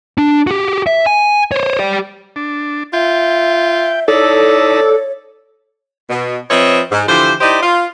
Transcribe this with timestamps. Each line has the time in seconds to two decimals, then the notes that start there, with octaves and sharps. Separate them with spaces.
0.18 D4
0.47 F#4 G4
0.87 E5
1.06 G#5
1.52 C5 C#5
1.79 G4 D5
2.36 D4
2.93 F4 E5 G5
4.08 D#4 E4 A4 C#5 D5
6.10 B2
6.50 F3 C4 B4 C#5 D#5 E5
6.92 G#2
7.08 D3 E3 F3 G4 C5
7.41 D#4 E4 G4 C5 D5 D#5
7.62 F4